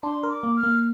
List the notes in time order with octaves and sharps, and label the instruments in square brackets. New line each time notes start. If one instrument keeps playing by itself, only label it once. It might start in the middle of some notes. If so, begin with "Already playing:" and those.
[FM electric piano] D4 [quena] C6
[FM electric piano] A#4
[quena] D6
[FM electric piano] A#3
[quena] F6
[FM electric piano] A#3